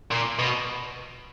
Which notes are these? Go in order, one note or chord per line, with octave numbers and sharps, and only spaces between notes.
A#2
B2